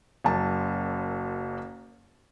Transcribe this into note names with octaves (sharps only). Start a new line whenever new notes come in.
F#1 F#2 A5